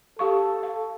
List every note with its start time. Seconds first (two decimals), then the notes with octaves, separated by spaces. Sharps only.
0.19 G4 A4 F5 C#6
0.63 F5